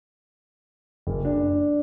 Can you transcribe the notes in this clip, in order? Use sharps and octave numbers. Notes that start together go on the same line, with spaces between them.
F#1
D4